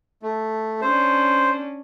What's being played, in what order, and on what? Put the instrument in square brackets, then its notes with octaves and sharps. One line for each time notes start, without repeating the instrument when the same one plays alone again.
[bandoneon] A3
[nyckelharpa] C#4 D4 [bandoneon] C5